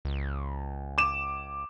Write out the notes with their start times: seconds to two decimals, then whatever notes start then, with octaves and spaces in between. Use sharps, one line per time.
0.05 C#2
0.98 D6 E7